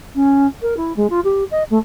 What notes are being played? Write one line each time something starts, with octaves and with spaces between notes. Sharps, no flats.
C#4
A#4
E4
G#3
F4
G4
D#5
A3